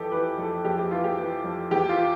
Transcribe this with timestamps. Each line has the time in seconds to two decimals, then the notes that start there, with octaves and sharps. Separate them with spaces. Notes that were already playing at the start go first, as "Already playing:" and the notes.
Already playing: F2 E3 G4 A4
0.12 E3 B4
0.38 F2 A4
0.65 F2 G4
0.79 G4
0.91 E3 F4
1.04 G4
1.18 E3
1.44 F2
1.71 E2 G4
1.89 F4